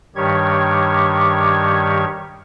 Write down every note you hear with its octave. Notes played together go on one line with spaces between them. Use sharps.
G2 D#3 G3 G4 C#5 G#6